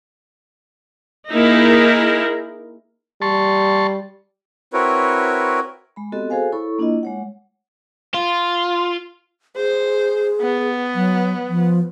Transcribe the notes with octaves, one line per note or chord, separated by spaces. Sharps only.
A#3 D#4 E4 G#4 A#4
G3 A5 C6 C#6
C4 E4 F#4 A#4 B4 C#5
G#3 B5
B3 C4 F#4 G4 A4 D#5
F#4 G#4 A4 C5 F5 G#5
E4 A4 C#5 B5 C#6
A#3 D4 E4 F4 D#5
G#3 C#5 F#5
F4
G#4 C5
B3
F#3
F3